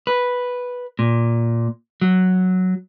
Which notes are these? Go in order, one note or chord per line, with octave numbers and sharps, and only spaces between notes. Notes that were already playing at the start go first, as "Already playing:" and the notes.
B4
A#2
F#3